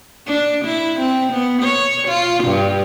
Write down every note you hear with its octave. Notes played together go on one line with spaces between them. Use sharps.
D4
E4
C4
B3
C#5
F4
G2